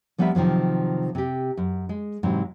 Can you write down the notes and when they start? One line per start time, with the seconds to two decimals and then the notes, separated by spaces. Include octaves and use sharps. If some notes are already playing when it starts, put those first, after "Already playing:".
0.18 F3 G3 B3 D4 A#4 E5
0.35 C3 D#3 F3 F#3
1.15 C3 G4
1.57 F#2
1.89 G#3
2.23 G#2 C3 E3 F#3